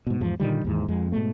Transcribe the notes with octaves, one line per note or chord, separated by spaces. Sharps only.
G#2 B2
E2 G#2 F3
A#2 D3 D#3 G3
D#2 G#2 E3
F2 G#3
G#2 B2 A3